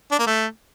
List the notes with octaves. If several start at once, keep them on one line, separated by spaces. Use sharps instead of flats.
D4
A#3
A3